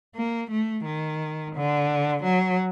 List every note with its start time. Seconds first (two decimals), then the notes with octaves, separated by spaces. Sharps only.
0.16 A#3
0.51 A3
0.85 D#3
1.55 D3
2.24 F#3